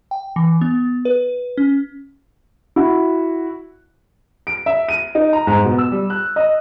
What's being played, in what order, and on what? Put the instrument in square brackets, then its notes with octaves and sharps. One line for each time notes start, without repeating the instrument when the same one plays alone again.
[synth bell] G5
E3
B3
B4
C#4
[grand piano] E4 F#4
D7
E5
D#7
D#4
A#5
G#2
B2
E6
G3
F#6
D#5